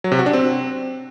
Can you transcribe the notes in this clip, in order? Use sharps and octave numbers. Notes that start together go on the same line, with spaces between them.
F#3
C3
F#4
D4
C4